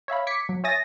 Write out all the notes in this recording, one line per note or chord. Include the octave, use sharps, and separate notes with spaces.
C#5 E5 F5 B5
D6 G#6 B6 C#7
F#3
C#5 E5 G#5 D#6 A6 A#6